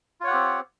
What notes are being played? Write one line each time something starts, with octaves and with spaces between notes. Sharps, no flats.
C4 F4 G4 C#5 F#5